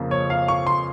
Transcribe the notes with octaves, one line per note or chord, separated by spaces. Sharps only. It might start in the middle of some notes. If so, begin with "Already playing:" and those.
Already playing: F2 C#3 F3 A#3 F4
C#5
F5
C#6
C6